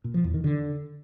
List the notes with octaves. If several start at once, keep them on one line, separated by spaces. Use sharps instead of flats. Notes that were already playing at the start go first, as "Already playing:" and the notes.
A#2
F3
E2
D#3
D3